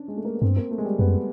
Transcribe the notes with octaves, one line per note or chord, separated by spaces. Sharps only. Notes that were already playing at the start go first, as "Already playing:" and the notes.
Already playing: C#4 D4
G#3
A3
A#3
B3
G2 C4
A#3
A3
G#3
G3
F#2 B3